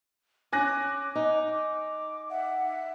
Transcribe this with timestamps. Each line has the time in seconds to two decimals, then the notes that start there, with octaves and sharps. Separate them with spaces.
0.53 C#4 G#5 D6 F#6 A#6
1.15 D#4
2.30 E5 F#5